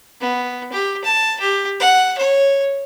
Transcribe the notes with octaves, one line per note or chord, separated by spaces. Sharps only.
B3
G4
A5
G4
F#5
C#5